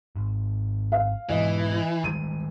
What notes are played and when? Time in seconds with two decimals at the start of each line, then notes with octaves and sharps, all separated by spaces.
0.16 G#1
0.92 F5
1.29 G#2 B2 E3 D#5
2.04 D#3 G3 G#3 D#7